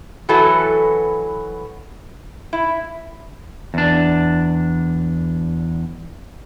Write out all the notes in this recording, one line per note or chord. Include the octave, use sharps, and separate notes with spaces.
E3 F#3 E4 F#4 A4 B4
E4
E2 D4